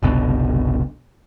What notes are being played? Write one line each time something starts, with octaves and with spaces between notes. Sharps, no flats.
F#1 C2 B2 D3